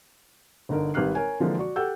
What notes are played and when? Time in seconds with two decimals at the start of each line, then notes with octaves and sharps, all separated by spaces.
0.69 G1 D3 D#4 A#4
0.94 G#1 G3 B4 F6 F#6 C7
1.15 A#4 C#5 G#5
1.40 D3 E3 F3 G#3 A#3 D4
1.58 F#4 D5 C#6
1.76 G4 A4 F#5 E6 G6